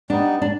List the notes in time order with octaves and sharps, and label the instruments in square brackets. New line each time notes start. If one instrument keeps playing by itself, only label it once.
[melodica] G3 B3 D#4 [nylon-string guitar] D4
[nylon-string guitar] D4